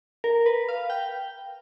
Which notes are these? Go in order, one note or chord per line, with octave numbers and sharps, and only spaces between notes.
A#4
B4
F5
G5